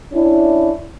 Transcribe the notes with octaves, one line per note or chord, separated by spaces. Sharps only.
C#4 D4 E4